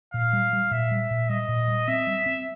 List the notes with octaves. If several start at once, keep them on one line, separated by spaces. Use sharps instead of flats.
A#2 F5
G3
G3
A#2 E5
G3
A#2
G3 D#5
A#2
G3
C4 E5
G3
C4